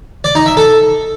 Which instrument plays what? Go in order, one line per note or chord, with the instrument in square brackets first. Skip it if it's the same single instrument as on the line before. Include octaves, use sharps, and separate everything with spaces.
[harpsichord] D5
D#4
E5
A4